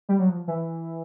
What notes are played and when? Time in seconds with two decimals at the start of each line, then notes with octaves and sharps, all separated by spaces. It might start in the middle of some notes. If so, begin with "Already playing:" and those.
0.09 G3
0.19 F#3
0.29 F3
0.47 E3